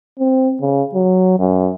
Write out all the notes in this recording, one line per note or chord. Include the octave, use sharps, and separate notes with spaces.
C4
C#3
F#3
F#2